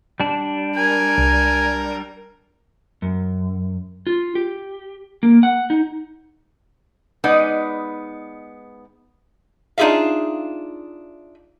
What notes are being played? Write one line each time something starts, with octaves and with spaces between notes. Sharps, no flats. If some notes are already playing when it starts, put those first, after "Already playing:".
G3 D4
A#4 G#5
C2
F#2
F4
G4
A#3
F#5
D#4
G#3 B3 D#4 D5
D4 D#4 F4 G#4 E5 F5